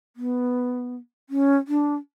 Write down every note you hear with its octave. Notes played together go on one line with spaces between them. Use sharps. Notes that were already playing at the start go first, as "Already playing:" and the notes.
B3
C#4
D4